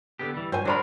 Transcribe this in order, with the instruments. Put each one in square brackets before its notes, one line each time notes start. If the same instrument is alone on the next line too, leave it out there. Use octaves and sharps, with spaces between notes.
[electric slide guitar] D3 B3 G4
E3 G3
[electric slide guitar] G2 [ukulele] C5 C#5 G#5
[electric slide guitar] F#3 G#4 A#4 [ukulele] D4 C5 B5